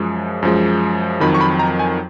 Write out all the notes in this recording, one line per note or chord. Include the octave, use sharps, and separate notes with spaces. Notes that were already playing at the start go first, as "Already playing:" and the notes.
Already playing: F#2 F3 G#3
F#2 F3 G#3
F2 D#3 F#3 B5
C#6
B5
A#5
G#5